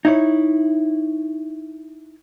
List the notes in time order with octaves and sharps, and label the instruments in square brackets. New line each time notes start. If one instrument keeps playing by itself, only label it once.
[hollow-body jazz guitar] D#4 E4 C#5